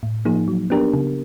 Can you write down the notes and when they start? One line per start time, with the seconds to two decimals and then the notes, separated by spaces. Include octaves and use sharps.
0.03 A2
0.25 F3 A#3 D#4 G#4
0.48 F#3
0.70 B3 D4 G4 A#4
0.93 C#3